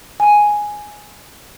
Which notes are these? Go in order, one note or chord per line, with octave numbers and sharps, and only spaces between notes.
G#5